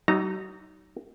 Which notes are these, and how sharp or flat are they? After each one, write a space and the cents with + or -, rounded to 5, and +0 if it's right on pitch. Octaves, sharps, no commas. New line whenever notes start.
F#3 +45 D#4 +0 A#5 -20